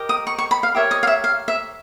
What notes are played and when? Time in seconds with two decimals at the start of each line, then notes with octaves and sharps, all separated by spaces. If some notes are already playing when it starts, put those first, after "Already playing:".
Already playing: G4 A#4 D#5
0.09 D#6
0.27 C#6
0.38 C#6
0.51 B5
0.63 F5
0.75 G4 A#4 C#5 E5
0.91 D#5
1.03 F5
1.07 E5
1.24 F5
1.48 E5